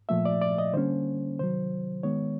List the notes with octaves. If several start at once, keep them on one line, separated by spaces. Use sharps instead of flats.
A#2 F3 A3 E5
D5
D5
D#5
D3 G3 A#3 C#4 C5
C3 D#3 F#3 C5
D#3 G#3 B3 C#5